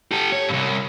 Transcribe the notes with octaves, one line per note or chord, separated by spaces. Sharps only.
G4 A4
C#5
C2 G2